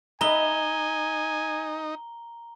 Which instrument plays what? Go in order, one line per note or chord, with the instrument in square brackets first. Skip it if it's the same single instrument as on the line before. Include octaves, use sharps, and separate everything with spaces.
[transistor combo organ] D#4 [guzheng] B4 D#5 E5 [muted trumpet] G#5 [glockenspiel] A#5 G7